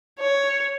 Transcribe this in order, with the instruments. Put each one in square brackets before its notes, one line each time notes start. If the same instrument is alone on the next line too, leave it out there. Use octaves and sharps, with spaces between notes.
[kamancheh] C#5